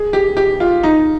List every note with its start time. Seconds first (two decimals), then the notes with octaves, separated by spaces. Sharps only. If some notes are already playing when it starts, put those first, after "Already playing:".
Already playing: G#4
0.13 G4
0.37 G4
0.60 F4
0.83 D#4